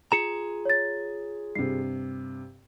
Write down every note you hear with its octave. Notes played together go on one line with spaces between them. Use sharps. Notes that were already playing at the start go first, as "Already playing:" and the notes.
F4 G#4 A#5 C#7 E7
C#5 A6
G2 C3 C7